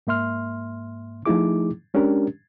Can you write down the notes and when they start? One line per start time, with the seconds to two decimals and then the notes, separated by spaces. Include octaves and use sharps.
0.07 G#2 A#3 E5 C6 F6
1.26 F3 A3 D#4 E4 G#4 D6
1.94 G#3 C#4 D4 G4 A#4